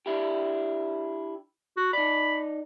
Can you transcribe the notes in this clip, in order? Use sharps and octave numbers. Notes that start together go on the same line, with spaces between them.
D4 E4 G4
F#4
D#4 D5 B5